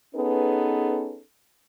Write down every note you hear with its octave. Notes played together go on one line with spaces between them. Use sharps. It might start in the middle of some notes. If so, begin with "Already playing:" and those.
B3 C#4 D#4 G#4 A4 B4